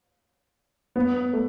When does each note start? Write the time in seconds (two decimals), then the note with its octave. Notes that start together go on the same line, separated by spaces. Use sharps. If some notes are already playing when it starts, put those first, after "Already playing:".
0.96 B3
1.33 A3